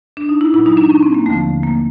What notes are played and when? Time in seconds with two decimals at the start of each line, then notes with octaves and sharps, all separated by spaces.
0.17 D4
0.29 D#4
0.41 E4
0.53 A#2 F#3 E4
0.66 D#4
0.77 D4
0.90 C#4
1.03 C4
1.14 A#3
1.26 D#2 D3 F3 A3
1.63 A#3